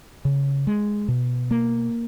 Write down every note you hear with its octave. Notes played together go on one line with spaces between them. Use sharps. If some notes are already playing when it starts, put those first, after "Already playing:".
C#3
G#3
B2
A#3